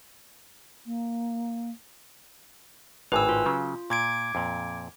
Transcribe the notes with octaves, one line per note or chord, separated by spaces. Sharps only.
A#3
G#1 A2 B4 G#5 E6
F4
C#3 F#3
A#2 D6 G#6 D7
F2 A#2